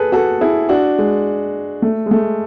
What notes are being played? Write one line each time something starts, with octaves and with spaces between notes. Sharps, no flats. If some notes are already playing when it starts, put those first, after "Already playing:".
Already playing: G#4 A4 B4
F#4 A4
E4 G#4
D4 F#4
G#3
A3
G#3
A3